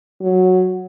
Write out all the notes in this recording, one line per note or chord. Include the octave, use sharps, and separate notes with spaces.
F#3